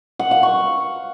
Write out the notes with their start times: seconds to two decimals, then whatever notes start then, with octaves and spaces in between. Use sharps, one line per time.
0.19 F#5
0.31 F5
0.43 C#6